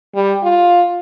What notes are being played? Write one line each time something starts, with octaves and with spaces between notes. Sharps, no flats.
G3
F4